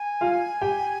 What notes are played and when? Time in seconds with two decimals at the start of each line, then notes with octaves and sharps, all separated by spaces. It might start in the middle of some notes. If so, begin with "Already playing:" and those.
Already playing: G#5
0.21 F4 F5
0.61 G4 G5